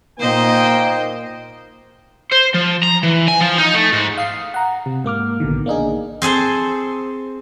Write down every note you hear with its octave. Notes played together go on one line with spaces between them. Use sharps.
A#2 A#3 D#4 C5 D#5 G5
C5
F3
A#5
E3
G#5
F3
D#4
A3
G#2
F5 D#6 C7
F#5 A#5
C3
G#2 A#3 D6 F6
A#1 B2 D3 D#3
A#3 D4 D#4 G#4
C4 G#4 A4 C5